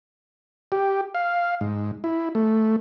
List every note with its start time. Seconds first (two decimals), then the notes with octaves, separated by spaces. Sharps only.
0.72 G4
1.15 F5
1.61 G#2
2.04 E4
2.35 A3